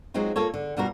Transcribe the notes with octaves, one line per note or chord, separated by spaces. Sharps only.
F#3 G#3 C4 D#4 F4
A#3 F4 A4 C#5
D3
B2 G3 F4 F#4 A#4